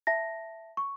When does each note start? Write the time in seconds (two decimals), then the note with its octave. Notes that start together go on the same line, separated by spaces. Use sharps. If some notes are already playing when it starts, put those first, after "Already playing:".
0.07 E5 A5 A#6
0.77 C#6